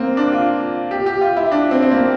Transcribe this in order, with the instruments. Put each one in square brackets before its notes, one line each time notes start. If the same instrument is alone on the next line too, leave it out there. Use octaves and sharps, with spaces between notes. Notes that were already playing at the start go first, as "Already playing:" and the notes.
Already playing: [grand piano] A#3 C4
D4
F4
G4
G4
F4
E4
D4
C4
C4
A#3